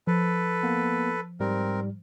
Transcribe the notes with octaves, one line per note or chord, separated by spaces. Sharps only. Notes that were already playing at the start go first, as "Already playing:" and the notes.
F3 A4 B4
A#3 B3
G#2 G3 C4 A#4